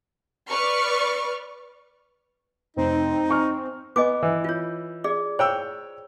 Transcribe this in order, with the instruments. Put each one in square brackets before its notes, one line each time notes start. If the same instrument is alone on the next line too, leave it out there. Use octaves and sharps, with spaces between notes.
[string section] B4 D5 C#6 F6
[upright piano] F1 [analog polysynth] C4 [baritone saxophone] D#4
[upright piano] G#5 C#6 F6
[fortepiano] B3 [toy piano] D#5 G#5 D6
[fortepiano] E3
[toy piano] F4 C#5
G#4 D5
[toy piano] C5 [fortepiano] C#5 G5 E6